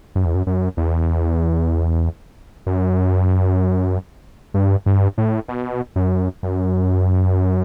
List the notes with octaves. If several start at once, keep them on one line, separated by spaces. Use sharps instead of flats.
F#2
E2
F#2
F#2
E2
F#2
G2
G2
A2
B2
F#2
F#2